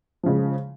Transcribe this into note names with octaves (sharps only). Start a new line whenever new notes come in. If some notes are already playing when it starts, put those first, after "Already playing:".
C#3 F3 G#3